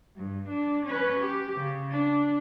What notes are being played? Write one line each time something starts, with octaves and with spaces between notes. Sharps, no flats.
G2
D4
C#4 B4
G4
C#3
D4